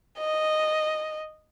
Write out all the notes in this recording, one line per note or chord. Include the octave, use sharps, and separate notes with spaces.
D#5